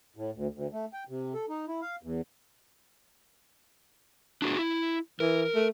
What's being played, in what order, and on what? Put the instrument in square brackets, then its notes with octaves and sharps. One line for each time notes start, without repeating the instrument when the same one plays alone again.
[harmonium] A2
D2
D2
A3
G5
C3
A4
D#4
E4
F5
E2
[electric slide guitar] D4 F#4 G#4
E4
[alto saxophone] E3 [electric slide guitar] A#4
[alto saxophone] A3